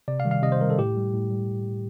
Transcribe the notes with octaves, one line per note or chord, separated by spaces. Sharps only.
C3 D5
F5
D#3 G3
F5
C3 D#5
C5
D#3 G3 A#4
A4
A2 G4
G3
A2
G3